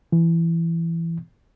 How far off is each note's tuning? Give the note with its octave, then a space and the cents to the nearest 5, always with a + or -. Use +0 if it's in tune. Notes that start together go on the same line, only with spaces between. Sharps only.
E3 +15